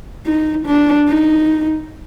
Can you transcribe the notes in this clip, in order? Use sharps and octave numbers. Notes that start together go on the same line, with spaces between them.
D#4
D4
D#4